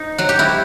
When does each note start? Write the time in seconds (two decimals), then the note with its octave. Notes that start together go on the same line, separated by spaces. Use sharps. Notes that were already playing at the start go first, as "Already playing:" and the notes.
Already playing: D#4
0.18 F#3 F#4
0.29 G4
0.39 E4 F#4